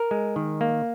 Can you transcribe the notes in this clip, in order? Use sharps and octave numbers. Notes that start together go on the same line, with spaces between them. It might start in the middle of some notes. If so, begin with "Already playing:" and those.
Already playing: A#4
G#3
D#3
A#3